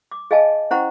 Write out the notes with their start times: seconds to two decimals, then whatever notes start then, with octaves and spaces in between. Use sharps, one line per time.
0.11 D6
0.31 G#4 D#5 F5 G#5 A5
0.71 C#4 E4 C5 F#5 A#5 C#6